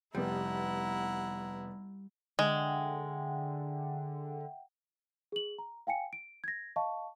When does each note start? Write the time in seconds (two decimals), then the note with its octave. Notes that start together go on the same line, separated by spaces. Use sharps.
0.15 F1 G3 B3 E4 G4 F#5 A#5
2.39 D3 G#3 E5 F#5 G5
5.32 G#4 F#7
5.58 A#5
5.87 F5 G5 G#5 C#7
6.13 D7
6.44 G#6 A#6
6.76 D#5 F5 A5 C#6